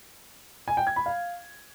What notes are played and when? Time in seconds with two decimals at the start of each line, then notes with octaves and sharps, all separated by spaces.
0.68 G#5
0.77 G5
0.87 G#6
0.96 B5
1.06 F5